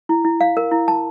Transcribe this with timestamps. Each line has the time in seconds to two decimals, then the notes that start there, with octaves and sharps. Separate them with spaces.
0.09 E4
0.25 E4
0.41 F5
0.57 A#4
0.71 E4
0.88 A5